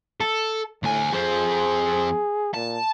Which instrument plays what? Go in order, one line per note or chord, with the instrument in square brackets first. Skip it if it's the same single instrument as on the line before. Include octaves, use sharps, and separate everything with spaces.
[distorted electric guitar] A4
[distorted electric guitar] D2 G#5 [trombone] A2
[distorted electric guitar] F2 C4 [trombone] G#4
[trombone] A#2 [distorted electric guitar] A5